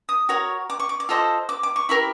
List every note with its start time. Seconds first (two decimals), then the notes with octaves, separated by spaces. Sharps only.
0.09 D#6
0.29 F#4 A#4 C#5
0.70 D6
0.80 C#6
0.89 D6
1.00 D6
1.09 F4 A4 C5 D#5
1.49 D6
1.63 D6
1.76 C#6
1.89 E4 G4 A#4 B5